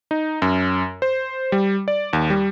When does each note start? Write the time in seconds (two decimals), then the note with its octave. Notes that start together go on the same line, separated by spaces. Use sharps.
0.11 D#4
0.42 F#2
1.02 C5
1.52 G3
1.88 D5
2.13 D#2
2.30 G3